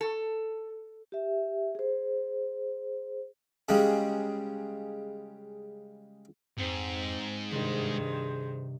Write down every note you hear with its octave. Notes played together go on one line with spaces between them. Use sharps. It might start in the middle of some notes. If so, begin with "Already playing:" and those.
A4
G4 E5
G#4 C5
C#3 G3 G#3
F2 G#2 C4
G2 C3 D#3 G#4 C5